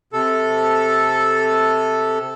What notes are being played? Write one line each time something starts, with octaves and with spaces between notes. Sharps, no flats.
C3 A4